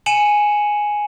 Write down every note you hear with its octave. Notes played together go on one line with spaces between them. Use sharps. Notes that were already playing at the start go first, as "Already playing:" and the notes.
G#5 C#7 D#7 E7 F#7